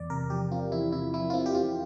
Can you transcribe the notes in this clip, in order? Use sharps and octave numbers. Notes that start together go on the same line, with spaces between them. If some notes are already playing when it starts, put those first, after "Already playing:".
Already playing: E2 D5
C3 A#4
F3 G4
C4 F4
E2 E4
C3 E4
F3 E4
F4
C4 E4
G4
E2 F4